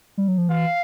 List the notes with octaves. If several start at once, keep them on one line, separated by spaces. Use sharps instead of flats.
G3
F#3
F3
E3 F5